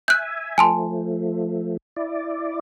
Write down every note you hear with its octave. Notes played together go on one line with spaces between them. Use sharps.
E5 G#5 F#6 G6
F3 A3 G#5 A5 C6
E4 D5